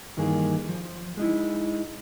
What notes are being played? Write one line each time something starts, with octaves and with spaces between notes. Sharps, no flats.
G2 D#3 E3 A#3 G#4
F3
G#3 D#4 E4